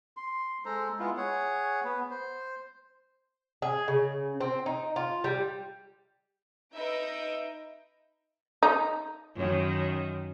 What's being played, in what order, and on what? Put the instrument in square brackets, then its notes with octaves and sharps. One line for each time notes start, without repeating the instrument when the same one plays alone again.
[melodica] C6
G#3 A4 C5 A#5
G#3 B3 E4 F4
G#4 C#5 F#5
B3 B4
C5
[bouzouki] G#4
C#3
C4
D#4
F4
G3
[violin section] D#4 B4 E5 A#5 G6 D7
[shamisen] D#4
[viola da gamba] F#2 D#3